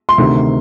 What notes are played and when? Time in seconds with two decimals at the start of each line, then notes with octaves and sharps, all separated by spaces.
0.09 C6
0.18 D2 C3 D#3